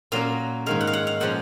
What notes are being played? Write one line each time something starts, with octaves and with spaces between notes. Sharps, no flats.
A#2 F#3 A#3 C#4 F5
G#2 D#3 G#3 F5
F#5
F5
F#5
F5
A#2 F3 G#3 C#4 F#5